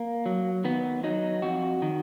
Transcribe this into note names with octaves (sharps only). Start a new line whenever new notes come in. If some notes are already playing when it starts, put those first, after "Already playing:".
Already playing: A#3
F#3
D#3 B3
F#3 D#4
F2 F#4
D#3